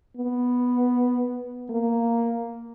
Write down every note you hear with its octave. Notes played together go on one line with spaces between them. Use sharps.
B3
A#3